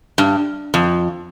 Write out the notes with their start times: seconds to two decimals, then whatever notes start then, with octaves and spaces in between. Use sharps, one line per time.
0.18 G2
0.74 F2